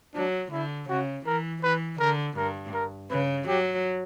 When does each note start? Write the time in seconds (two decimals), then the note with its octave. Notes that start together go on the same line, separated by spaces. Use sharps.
0.14 F#3 D4
0.52 D3 E4
0.89 C#3 F#4
1.26 E3 A#4
1.63 E3 B4
2.00 D3 A#4
2.37 G2 A#4
2.74 A#4
3.10 C#3 B4
3.47 F#3 G4